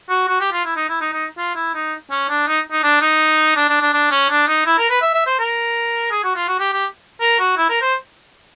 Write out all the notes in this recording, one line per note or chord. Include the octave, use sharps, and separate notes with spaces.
F#4
F#4
G4
F4
E4
D#4
E4
D#4
D#4
F4
E4
D#4
C#4
D4
D#4
D#4
D4
D#4
D4
D4
D4
D4
C#4
D4
D#4
E4
A#4
B4
E5
E5
C5
A#4
G#4
F#4
F4
F#4
G4
G4
A#4
F#4
E4
A#4
C5